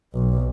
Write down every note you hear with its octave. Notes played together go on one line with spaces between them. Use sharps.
B1